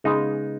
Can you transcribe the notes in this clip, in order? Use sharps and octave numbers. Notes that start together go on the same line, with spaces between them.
C#3 G#3 B3 D#4